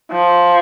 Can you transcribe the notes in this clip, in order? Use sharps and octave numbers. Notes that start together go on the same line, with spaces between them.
F3